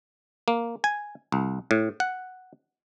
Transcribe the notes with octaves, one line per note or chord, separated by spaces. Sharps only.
A#3
G#5
C2
A2
F#5